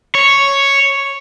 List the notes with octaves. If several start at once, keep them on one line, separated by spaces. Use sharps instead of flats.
C#5